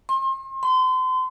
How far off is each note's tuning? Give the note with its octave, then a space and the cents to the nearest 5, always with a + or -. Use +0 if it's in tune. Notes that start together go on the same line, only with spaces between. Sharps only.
C6 +35
C6 -35